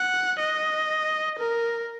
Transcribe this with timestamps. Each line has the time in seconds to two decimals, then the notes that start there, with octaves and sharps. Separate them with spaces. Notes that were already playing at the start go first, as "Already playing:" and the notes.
Already playing: F#5
0.39 D#5
1.39 A#4